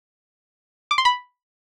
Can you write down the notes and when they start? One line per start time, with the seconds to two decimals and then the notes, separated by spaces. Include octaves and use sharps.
0.91 D6
0.98 C6
1.05 B5